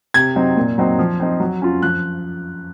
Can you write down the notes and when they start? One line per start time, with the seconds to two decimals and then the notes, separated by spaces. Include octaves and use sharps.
0.14 C3 G#6
0.36 F#3 C4 D#4
0.56 A#2
0.78 F#3 C4 D#4
0.99 F3
1.20 C4 D#4
1.40 F#3
1.62 C#4 F4
1.82 F3 F#6